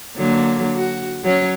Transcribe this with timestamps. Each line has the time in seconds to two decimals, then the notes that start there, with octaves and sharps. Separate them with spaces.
0.17 D3 F#3 A#3
0.76 F#4
1.24 F#3 C#4 C#5